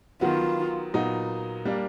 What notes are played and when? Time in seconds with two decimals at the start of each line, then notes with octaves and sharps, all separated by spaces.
0.21 D#3 F#3 B3 F4
0.94 A#2 F#3 B3 D#4
1.65 G3 A#3 D4